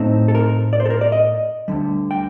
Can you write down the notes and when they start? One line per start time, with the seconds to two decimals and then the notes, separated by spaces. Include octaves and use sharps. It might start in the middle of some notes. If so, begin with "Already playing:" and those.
Already playing: A2 A3 C4 D#4
0.28 A4
0.35 A#4
0.73 D5
0.80 C5
0.86 A4
0.90 A#4
1.01 D5
1.12 D#5
1.68 D2 D3 G3
2.11 G5